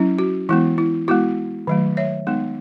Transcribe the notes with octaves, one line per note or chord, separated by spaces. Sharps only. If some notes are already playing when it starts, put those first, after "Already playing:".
Already playing: F#3 C#4 E4
F#4
E3 G#3 B3 E4
E4
G#3 B3 E4 F#4
D#3 F#3 A3
C#5 E5
G#3 B3 D#4